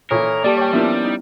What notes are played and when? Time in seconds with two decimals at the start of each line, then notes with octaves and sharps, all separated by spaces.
0.11 A#2 E3 A4 A#4 C#5 D#6
0.44 G3 A#3 G4 D5 A5
0.57 C#5 G5 G#5 D6
0.73 F3 A#3 B3 C#4 D4 E4 E5
1.04 D#4